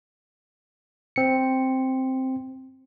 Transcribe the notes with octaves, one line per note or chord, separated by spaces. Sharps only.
C4 C#7